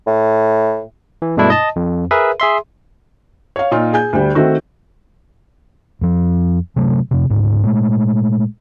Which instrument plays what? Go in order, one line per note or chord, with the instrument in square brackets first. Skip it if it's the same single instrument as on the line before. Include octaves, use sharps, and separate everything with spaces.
[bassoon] A2
[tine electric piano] E3
G2 B2 G#3 A3 D4 E4
D#5 A5
F2
G#4 A#4 B4 E5
G#4 E5 C6
[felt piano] C#5 F5
A#2 D#4 F4
G#4 G#5 G6
D2 G3
D#3 A3 C4 F#4
[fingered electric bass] F2 F3
C3 F#3 A3
F2 C3
D2 G#2
A#2 G#3 A3